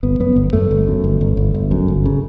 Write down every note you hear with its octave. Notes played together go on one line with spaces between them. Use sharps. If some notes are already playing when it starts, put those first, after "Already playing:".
G1 B3
F#2 B3
G1
F#2 A3
G1
F#2
G1
G1
G1
G1
F#2
G1
C#3